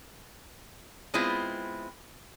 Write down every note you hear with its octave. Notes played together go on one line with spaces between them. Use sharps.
G#3 B3 C4 E4 F4